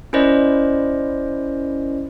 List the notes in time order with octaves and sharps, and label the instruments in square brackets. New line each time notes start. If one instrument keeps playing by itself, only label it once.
[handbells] C#4 E4 A#4 C5 D5 D#5